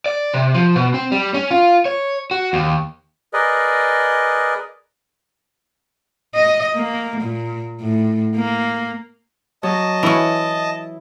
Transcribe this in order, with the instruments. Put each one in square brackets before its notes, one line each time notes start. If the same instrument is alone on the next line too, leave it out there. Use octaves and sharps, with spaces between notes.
[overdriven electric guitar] D5
C3
F3
B2
C4
G3
C#4
F4
C#5
F#4
D#2
[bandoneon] G#4 A#4 B4 D5 D#5
[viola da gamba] D#5
A#3
A#2
A2
A#3
[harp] F#3 [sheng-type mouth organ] D#5 A5
[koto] E3 C#4 [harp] E4